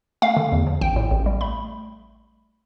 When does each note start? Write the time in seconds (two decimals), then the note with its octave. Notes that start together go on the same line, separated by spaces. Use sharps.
0.22 A3 F5
0.37 D3
0.52 E2
0.67 F3
0.81 A1 G5
0.96 A2
1.11 A1
1.26 G3
1.41 A3 B5